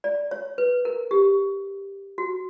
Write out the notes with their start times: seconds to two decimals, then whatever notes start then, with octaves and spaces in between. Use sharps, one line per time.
0.04 D5
0.31 C#5
0.58 B4
0.85 A#4
1.11 G4
2.18 F#4